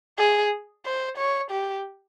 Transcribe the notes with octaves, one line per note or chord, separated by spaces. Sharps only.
G#4
C5
C#5
G4